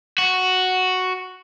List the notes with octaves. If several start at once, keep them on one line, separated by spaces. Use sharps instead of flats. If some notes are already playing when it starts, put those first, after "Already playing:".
F#4